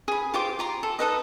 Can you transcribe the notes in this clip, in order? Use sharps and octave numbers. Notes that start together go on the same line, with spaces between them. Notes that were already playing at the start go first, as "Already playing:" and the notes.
G#4 B5
F4 G4 C5 D6
F4 A#5 C6
A4
D#4 A4 B4 D#5